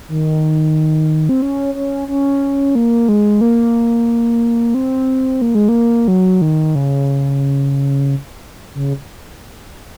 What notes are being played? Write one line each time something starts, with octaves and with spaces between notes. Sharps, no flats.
D#3
C4
C#4
C#4
C#4
A#3
G#3
A#3
C4
A#3
G#3
A#3
F#3
D#3
C#3
C#3